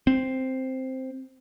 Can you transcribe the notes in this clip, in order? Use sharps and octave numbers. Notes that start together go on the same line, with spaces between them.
C4